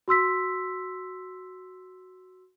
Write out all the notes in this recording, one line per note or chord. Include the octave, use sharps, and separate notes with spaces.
F#4 C6 E6 B6